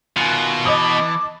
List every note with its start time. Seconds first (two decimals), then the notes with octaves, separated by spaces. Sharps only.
0.17 B2 D#3 F4 G#5 F#6
0.65 E3 D#5 A5 D6 D#6